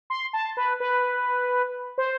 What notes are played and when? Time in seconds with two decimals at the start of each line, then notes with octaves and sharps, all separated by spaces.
0.10 C6
0.33 A5
0.57 B4
0.80 B4
1.98 C5